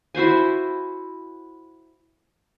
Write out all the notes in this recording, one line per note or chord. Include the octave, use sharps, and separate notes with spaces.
E4 F#4 C5 G#5